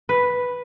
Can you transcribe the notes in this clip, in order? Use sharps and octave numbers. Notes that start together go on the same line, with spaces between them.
B4